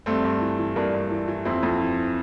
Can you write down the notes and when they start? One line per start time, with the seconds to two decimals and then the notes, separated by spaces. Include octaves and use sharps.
0.06 G2 A3 C4
0.24 G2
0.42 E3
0.59 E3
0.76 G2 A#3 D4
0.94 G2
1.11 E3
1.28 E3
1.45 F2 C4 E4
1.63 F2
1.81 E3
1.98 E3